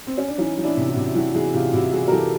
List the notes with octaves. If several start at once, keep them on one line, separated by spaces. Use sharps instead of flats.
C4
C#4
D4
E3 C#4 D#4
E3
D4 E4
C3
E4 F#4
C3
E3 E4 F#4
E3 F#4 G#4
C3 F4 G4
C3 E4 F#4
E3 F#4 G#4
A#4
E3 G4 A4